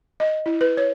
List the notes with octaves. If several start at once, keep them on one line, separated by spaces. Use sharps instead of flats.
D#5
E4
B4
C#5